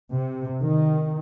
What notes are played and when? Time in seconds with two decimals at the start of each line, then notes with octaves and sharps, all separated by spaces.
0.13 C3
0.61 D#3